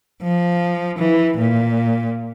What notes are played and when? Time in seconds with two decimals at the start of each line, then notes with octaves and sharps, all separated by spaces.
0.23 F3
0.99 E3
1.37 A#2